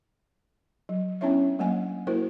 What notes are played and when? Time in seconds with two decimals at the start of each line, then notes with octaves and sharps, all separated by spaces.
0.89 F#3
1.21 B3 C#4 D4 E4 C#5 E5
1.59 F#3 A3 A#3 F#5 G#5
2.07 A#3 E4 F#4 A#4 C5